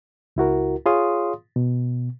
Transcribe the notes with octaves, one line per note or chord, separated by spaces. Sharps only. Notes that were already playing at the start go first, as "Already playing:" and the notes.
C#2 E4 F#4 A#4
F4 G#4 C#5 F5 C6 D#6
B2